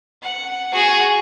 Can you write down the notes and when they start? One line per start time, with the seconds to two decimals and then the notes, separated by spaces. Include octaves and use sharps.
0.22 F#5
0.73 F#4 G#4